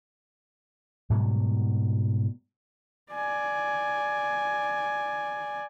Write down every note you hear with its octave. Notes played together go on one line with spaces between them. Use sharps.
G#2 B2 F#3 G3
D5 G#5